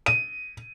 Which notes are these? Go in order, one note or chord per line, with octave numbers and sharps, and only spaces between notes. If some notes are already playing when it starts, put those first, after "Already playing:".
D#7